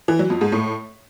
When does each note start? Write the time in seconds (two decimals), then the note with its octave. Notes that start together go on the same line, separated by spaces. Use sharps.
0.08 E3
0.19 F#3
0.30 F2
0.41 G#2
0.52 A2